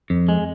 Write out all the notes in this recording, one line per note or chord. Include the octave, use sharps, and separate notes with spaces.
F2
G#3